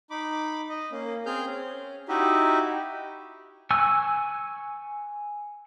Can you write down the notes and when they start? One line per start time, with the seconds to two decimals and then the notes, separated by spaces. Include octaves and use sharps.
0.10 D#4 B5 D6
0.69 D#5
0.92 A#3 C#4
1.26 C4 G#4 F6 G6
1.46 C#4
2.09 D#4 E4 F#4 G4 D#5 E5
3.71 G#5 C#6 E6 F#6